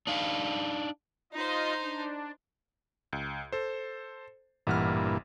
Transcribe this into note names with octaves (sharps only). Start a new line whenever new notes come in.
D4 D#4 F5
D#4 F4 C5 D#5
D4
C#2
A4 C5
A1 G2 A#2 E3 F#5 F6